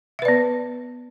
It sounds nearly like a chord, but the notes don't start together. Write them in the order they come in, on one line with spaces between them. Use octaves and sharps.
E5 B4 D5 B3